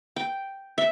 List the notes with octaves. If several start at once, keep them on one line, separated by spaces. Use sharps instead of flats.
G5
E5